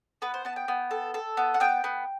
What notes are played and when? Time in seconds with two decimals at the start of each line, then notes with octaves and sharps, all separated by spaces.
0.22 B3 B4
0.34 C5
0.45 B3 A5
0.56 G5
0.68 B3
0.91 A4
1.14 A4
1.37 B3
1.54 F#5
1.60 B3 G5
1.84 B3